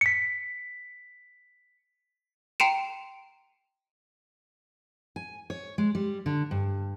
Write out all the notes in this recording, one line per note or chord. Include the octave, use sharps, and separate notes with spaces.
B6 C#7
G5 A#5 C6 C#7 D7 E7
G#5
C#5
G#3
G3
D3
G2